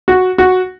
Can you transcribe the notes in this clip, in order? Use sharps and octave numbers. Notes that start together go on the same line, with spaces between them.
F#4
F#4